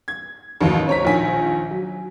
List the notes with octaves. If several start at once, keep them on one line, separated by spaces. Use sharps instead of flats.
G#6
A1 D#2 F#3
C5 C#5 A#5 B6
A#1 D#3 G#5 B6
F#3